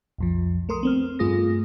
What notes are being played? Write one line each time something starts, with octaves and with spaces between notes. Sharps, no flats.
B1 F2 F3
A3 A#4 C6 D#6
B3 C4 F6
G2 A3 F4 G#4 D#6 A#6